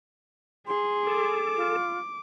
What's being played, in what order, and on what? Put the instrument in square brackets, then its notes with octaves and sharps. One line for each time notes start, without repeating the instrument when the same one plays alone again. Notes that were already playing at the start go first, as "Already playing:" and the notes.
[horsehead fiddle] G#4 [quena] C6
[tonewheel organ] A4 [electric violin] D6
[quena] F4